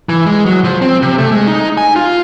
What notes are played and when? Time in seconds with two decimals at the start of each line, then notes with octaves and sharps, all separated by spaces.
0.09 E3
0.26 G#3
0.46 F#3
0.64 F3
0.82 C4
1.02 C3
1.18 A3
1.32 G#3
1.47 D#4
1.78 G#5
1.96 F4